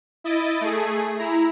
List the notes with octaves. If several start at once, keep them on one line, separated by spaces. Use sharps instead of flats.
E4 D#5 A6 D7
A3 G#4
E4 A#5